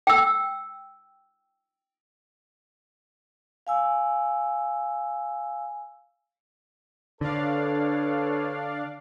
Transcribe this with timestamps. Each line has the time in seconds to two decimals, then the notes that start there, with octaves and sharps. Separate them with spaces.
0.07 G5 E6
3.67 F5 G#5 E6
7.21 D3 D4 A4 B4 C#5 D5 F5